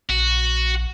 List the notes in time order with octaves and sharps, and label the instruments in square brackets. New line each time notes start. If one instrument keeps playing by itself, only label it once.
[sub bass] A#1 [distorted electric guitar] F#4